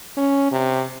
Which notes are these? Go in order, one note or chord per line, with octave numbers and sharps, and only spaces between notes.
C#4
C3